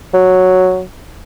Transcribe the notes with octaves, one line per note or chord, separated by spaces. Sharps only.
F#3